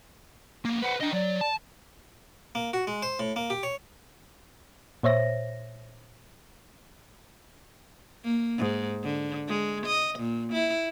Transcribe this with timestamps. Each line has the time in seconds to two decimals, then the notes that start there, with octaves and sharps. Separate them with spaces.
0.65 A#3 B3
0.82 B4 C5 F#5
1.00 D4 D#5 G5
1.13 F#3 D5
1.41 A5
2.55 A#3
2.73 F#4
2.87 G#3
3.02 C5
3.19 A2
3.36 A#3
3.50 G4
3.63 C#5
5.03 A#2 C5 C#5 E5 A#6
8.24 A#3
8.58 G#2
9.03 D3
9.48 G#3
9.86 D#5
10.19 A#2
10.53 E4